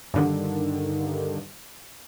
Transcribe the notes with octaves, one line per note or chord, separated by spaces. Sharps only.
G2 D3 D#3